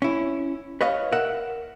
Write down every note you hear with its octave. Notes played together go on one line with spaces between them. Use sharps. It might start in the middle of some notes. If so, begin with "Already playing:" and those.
C#4 E4
B4 C#5 D#5 F5
A#4 E5 F#5